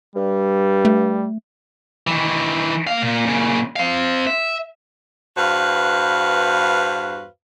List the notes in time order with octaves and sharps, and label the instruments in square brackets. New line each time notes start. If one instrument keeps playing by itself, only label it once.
[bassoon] G2 [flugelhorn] G3
[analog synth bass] A3
[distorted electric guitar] D#3 E3
A#3 F5
A#2
A#2 C#3
C4 F5
E5
[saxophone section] E2 G2 F#4 B4 C5 F5